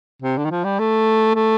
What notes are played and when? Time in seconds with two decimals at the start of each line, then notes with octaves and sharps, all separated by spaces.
0.22 C3
0.38 D3
0.45 D#3
0.51 F3
0.64 G3
0.79 A3
1.35 A3